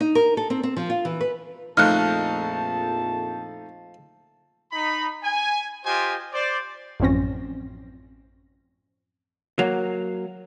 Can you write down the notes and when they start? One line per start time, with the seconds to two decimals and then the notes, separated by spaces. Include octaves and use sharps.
0.01 D#4
0.15 A#4
0.37 A4
0.50 C4
0.63 C4
0.77 F3
0.90 F4
1.05 E3
1.21 B4
1.77 A#1 F2 F3 A3 D#4 A5 F6 F#6
4.72 D#4 B5
5.23 G#5
5.85 F4 G4 C5 D#5 G#5
6.32 C5 D5
7.00 A1 F#2 F3 C4 C#4 A#6
9.59 F#3 A#3